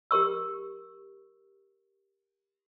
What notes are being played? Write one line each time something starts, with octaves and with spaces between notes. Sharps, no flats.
G4 A#4 C#6 E6